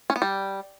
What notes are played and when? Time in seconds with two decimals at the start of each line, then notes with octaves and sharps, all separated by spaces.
0.10 C#4
0.16 B3
0.22 G3